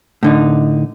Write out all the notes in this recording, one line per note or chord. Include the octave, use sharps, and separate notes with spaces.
A2 D3 D#4